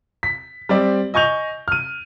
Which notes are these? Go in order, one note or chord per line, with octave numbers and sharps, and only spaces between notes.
B6
G3 C4 D5
D#5 G#5 C#6 G6 F7
F6 D#7